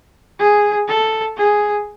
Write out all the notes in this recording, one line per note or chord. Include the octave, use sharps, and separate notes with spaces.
G#4
A4
G#4